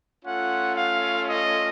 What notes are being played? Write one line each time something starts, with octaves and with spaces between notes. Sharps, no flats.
A3 C#4 F4 F#5
F5
D#5